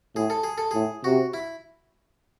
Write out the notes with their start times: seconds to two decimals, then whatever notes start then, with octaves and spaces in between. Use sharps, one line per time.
0.16 A2 G#4
0.30 A4
0.44 G#4
0.58 A4
0.71 A2 G#4
1.04 C3 F#4
1.34 E4